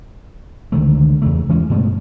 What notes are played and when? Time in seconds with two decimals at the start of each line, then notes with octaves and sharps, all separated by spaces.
0.72 C#2 D3 D#3 A3
1.22 E2 C#3 A3
1.49 E3 G#3 C#4
1.70 G2 B2 G#3 A3